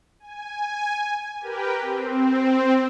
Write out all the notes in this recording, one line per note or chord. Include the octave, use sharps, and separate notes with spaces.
G#5
G4 A#4 B4 G5
C4